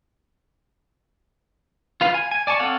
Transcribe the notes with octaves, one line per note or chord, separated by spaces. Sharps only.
F4 B4 F5
G#5
G#5
D5 G#5 A5 C#6
C4 A4 C#5 F5 F#5